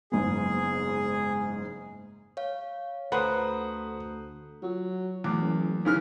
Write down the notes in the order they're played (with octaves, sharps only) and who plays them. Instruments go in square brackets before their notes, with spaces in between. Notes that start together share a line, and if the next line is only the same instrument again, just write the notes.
[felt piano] F#1 G#2 B3 [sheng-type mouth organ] G#4
[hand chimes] C#5 F5
[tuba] D2 [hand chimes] A4 A#5 D#6 [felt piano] B4 C5 F#5
[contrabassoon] F#3 [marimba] F4 F#4
[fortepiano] E2 [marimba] F#3 A3 D6
[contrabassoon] F#1
[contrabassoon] D#2 [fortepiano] C#3 E3 F6